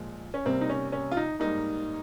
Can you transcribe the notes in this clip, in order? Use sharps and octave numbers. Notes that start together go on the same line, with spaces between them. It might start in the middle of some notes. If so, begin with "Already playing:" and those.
Already playing: A#2 F3 G#3
C#4
C3 G3 A#3 C4
D#4
C#4
C#4
F4
D#4
G#2 G3 A#3 D#4